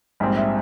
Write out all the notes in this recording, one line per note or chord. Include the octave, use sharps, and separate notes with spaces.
A#1 G#2 G3 C4
E5